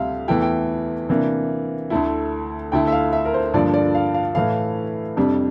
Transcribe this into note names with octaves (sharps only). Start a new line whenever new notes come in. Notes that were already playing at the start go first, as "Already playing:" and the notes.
Already playing: D2 C3 G3 E5 F5
E2 E3 A3 E4 G5
G5
C3 E3 A#3 D4
D2 D3 A3 E4
D2 D3 A3 E4 G5
E5
F5
E5
A#4
C5
G2 D3 F3 A#3 D4 D5
D5
F5
F5
A2 E3 A3 F5
F2 C3 G3 D4